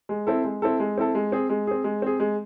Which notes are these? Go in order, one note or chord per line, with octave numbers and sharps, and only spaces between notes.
G#3
C4 E4 A4
G#3
C4 E4 A4
G#3
C4 E4 A4
G#3
C4 G#4
G#3
C4 G#4
G#3
C4 G#4
G#3